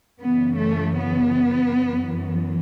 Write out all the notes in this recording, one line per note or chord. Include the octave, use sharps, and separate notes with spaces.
F#2 C#3 E3 B3
A3
B3
F#2 E3